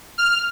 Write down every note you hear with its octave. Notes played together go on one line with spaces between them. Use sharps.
F6